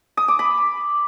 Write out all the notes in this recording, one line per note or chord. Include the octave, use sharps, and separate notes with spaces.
D#6
D6
B5